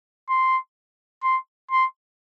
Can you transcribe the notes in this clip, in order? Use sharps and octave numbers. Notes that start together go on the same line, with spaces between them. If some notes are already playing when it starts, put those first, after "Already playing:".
C6
C6
C6